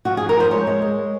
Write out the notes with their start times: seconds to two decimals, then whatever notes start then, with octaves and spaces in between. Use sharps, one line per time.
0.05 F3 F#4
0.17 G#4
0.20 F2
0.29 A#4
0.36 F3 C5
0.51 G#3 C#5
0.67 G#3
0.82 G#3